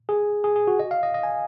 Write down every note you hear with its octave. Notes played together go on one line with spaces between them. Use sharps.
G#4
G#4
G#4
F#4
D#5
F5
D#5
D#5
G#5